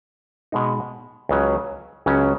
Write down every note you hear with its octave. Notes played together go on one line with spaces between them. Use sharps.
B2 G#3 D#4
C#2 C#3 F#3 C#4
C#2 C#3 F#3 C#4